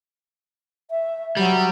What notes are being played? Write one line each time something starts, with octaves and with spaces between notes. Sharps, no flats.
E5
F#3 G3